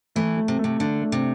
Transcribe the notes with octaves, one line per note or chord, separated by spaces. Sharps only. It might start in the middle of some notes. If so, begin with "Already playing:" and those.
E3 A3
A3
C3
C3 A3
D3 D4
A3
C3